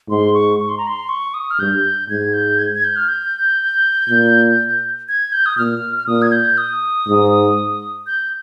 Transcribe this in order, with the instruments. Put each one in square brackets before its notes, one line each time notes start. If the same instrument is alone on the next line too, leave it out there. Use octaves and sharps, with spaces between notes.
[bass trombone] G#2 [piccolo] C6
[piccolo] C#6
C#6
C6
A#5
C6
C#6
D#6
F6
[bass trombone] G2 [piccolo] G6
[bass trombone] G#2 [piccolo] G#6
[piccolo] G6
G#6
G#6
G6
F6
G6
[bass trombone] A#2
[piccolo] G#6
G6
D#6
[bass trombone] A#2 [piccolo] F6
[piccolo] F6
[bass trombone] A#2 [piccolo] D#6
[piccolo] G#6
G6
D#6
[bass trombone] G#2
[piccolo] G6